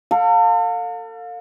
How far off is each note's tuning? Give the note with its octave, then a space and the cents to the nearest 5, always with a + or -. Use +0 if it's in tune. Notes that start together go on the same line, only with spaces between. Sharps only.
A4 +40 F5 +30